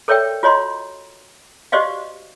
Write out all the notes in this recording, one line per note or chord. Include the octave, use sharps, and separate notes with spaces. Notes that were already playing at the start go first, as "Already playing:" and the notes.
A4 A#4 C#5 D5 E5 G5
F4 F#4 C#5 D#5 A#5 C6
F#4 G4 C5 D5 D#5 F5